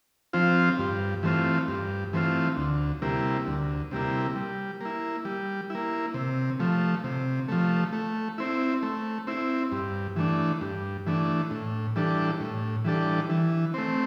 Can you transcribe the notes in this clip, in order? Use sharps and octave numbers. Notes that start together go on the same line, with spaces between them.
F3 C4 F4
G2
E3 A3 C4 F4
G2
E3 A3 C4 F4
D2
C3 G3 A#3 E4
D2
C3 G3 A#3 E4
G3
A#3 E4
G3
A#3 E4
C3
F3 A3
C3
F3 A3
A3
C4 E4
A3
C4 E4
G2
E3 A3 D4
G2
E3 A3 D4
A2
E3 G3 D4 A4
A2
E3 G3 D4 A4
E3
A3 C4